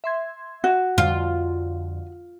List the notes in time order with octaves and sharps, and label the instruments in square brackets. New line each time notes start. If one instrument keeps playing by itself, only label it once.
[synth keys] E5 C6 G#6
[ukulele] F#4
[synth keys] F2 D3 [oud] F4